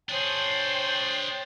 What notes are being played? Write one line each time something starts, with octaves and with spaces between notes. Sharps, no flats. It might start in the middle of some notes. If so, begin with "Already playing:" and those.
D4 G#4 C5 C#5 G5